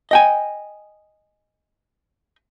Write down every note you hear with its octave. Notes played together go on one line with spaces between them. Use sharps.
D#5 G5 G#5